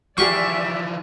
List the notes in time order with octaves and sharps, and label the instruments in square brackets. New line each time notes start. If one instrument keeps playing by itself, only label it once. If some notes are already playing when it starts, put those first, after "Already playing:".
[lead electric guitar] E3 F3 [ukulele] F4 G4 G#4 [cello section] D5 E5 [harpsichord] C#6